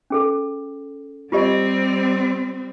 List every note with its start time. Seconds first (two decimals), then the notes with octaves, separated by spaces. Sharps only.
0.10 C#4 G#4 A4
1.32 G3 C4 F4 G4 D#5